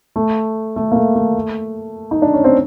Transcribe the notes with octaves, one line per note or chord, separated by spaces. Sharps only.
A3
A3
A#3
A3
A3
D#4
D4
C#4
C4